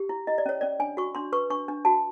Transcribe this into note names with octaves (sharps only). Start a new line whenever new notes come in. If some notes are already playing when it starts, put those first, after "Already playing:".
Already playing: G4
E4
E4 D#5
D5
C#4 C#5
C#4 D5
D4 G#5
F#4 C#6
D4 C6
B4 C#6
D4 C#6
D4
F#4 A5